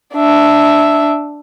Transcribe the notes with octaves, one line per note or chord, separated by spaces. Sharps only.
D4 E5